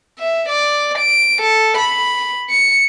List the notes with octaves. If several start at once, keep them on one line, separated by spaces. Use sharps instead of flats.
E5
D5
D7
A4
B5
C#7